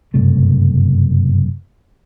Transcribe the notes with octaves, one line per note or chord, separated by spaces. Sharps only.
F#1 G2 C3 A3